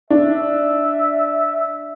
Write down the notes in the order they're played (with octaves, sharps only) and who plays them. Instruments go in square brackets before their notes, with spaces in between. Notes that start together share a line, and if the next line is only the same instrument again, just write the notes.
[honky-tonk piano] D4 [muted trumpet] E5